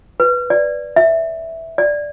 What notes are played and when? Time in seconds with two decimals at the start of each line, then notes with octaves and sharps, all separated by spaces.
0.20 B4
0.50 D5
0.96 E5
1.78 D5